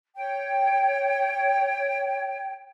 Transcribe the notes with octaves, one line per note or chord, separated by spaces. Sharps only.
C#5 G5